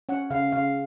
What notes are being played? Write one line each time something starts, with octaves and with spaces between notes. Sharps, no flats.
C#4 F#5
C#3 F5
C#3 F5